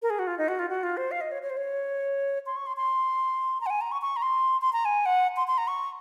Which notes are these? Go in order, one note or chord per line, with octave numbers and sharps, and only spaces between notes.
A#4
G#4
F#4
F4
D#4
F#4
F4
F#4
F4
C5
F5
D#5
C#5
C#5
C5
C#5
C6
C#6
C6
C6
A#5
F#5
G#5
A#5
C#6
C#6
A#5
C6
C6
A#5
G#5
F#5
C6
C6
A#5
C#6